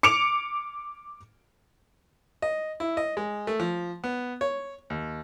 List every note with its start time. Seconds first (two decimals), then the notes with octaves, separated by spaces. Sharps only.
0.03 D6 C#7 D7 F7
2.42 D#5
2.80 E4
2.97 D#5
3.17 G#3
3.47 A3
3.60 F3
4.04 B3
4.41 C#5
4.90 D#2